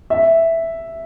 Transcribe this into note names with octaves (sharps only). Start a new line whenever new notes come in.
E5